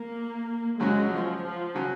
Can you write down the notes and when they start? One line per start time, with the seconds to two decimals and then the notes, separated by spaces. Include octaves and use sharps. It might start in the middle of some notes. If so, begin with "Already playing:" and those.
Already playing: A#3
0.80 F#2 C#3 F#3 G#3 C#4 F#4
1.11 F3
1.42 F3
1.75 C#3 F#3 C#4 F#4